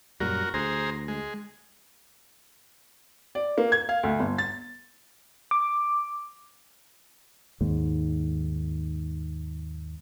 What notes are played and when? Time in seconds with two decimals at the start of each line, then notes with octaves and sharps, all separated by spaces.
0.20 F#2 A#2 G3 F#4 A#4
0.54 D2 G#4 C5 A#5
1.08 G#3
3.35 D5
3.58 A#3
3.72 G#6
3.89 F5
4.03 D2
4.20 G1
4.38 A6
5.51 D6
7.61 D#2 G#2